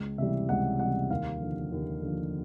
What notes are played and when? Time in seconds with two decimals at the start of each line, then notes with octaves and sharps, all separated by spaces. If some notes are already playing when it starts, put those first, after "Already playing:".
Already playing: C#2
0.18 C3 E3 G3 E5
0.49 C#2 F#5
0.79 C3 E3 G3 F#5
1.10 D#2 F5
1.42 D3 F3
1.72 D#2
2.02 D3
2.07 F3